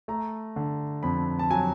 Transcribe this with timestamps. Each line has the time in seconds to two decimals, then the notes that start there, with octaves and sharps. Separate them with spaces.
0.08 A3 A#5
0.56 D3
1.03 F2 B5
1.39 A5
1.50 F#3 G#5